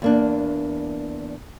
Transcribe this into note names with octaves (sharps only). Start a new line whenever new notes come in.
E2 A#3 D4